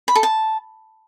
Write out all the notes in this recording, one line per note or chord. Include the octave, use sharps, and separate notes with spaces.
B5
A4
A5